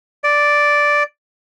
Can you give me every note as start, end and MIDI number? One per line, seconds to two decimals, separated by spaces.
0.24 1.03 74